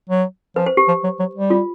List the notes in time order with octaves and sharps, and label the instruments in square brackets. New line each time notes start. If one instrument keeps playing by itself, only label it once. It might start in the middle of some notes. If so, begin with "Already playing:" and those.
[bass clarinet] F#3
[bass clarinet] F3 [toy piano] B4
[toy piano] C5
G4
[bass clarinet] F3
F#3
F#3
G3
[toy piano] F4